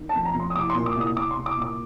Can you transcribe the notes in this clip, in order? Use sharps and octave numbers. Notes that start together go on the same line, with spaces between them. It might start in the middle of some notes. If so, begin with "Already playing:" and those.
Already playing: D#3
A5
F2
A#5
F2
C6
D#6
C2 D6
C6
A#2
D6
C2
D#6
C2 D6
C6
C2
D6
A#2
D6